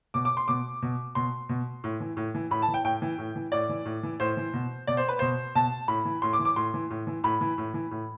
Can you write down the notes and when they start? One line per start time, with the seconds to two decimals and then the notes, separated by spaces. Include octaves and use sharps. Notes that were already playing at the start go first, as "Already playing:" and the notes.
0.14 B2 D6
0.25 D6
0.37 C6
0.48 B2 D6
0.82 B2
1.15 B2 C6
1.49 B2
1.84 A2
2.00 E3
2.17 A2
2.35 E3
2.51 A2 B5
2.62 A5
2.68 E3
2.74 G5
2.85 A2 G5
3.02 E3
3.19 A2
3.36 E3
3.52 A2 D5
3.69 E3
3.85 A2
4.03 E3
4.20 A2 C5
4.37 E3
4.54 B2
4.87 B2 D5
4.97 C5
5.09 B4
5.19 B2 C5
5.55 B2 A5
5.88 A2 B5
6.05 E3
6.22 A2 C6
6.33 D6
6.39 E3
6.45 D6
6.56 A2 C6
6.74 E3
6.90 A2
7.07 E3
7.24 A2 B5
7.41 E3
7.58 A2
7.74 E3
7.91 A2